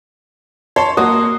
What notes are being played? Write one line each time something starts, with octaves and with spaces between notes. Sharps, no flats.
C#5 A5 C6
A#3 F#4 D#6